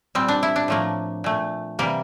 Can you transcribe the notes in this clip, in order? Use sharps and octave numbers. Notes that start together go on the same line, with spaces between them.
A#2 G3 C4
D4
E4
D4
A2 F3 A3 A#3
A#2 A3
C3 E3 G3 A#3